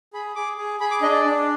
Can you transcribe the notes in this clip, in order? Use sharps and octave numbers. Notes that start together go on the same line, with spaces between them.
G#4 B5
G#4 D6
G#4
G#4 B5
D6
D4 D#5
D5
D4